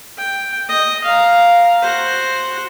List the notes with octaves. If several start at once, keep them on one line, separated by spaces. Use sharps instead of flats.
G5
D#5
F5 A#5
F#4 C5